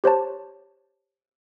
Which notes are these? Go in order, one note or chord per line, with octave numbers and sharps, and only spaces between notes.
G4 C5 C#5 A5